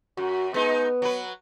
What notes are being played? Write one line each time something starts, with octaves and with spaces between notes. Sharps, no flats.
F#2 F#4
G#3 B3 D#4
F#3 B4